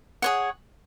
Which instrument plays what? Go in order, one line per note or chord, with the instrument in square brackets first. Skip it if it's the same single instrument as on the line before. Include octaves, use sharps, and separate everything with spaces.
[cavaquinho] G#4 C#5 F#5